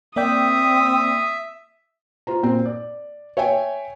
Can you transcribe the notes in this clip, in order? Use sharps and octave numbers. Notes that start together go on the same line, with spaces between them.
A#3 C4 D5 E5 G5 D#6
F4 C5 A#5
A#2 C4
D5
C#5 E5 G5 G#5